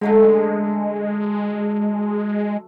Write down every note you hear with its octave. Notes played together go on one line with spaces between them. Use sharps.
D3 F#3 G#3 A3